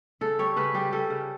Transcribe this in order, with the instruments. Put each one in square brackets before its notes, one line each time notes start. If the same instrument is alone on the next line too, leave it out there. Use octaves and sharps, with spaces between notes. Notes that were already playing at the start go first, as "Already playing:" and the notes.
[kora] C#3 A4
G3 C#5
C#3 B4
G3 G4
G3 A4
C#3